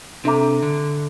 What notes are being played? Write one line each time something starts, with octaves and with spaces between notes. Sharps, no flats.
C3 D4 A4 E5 A#5 D6
D3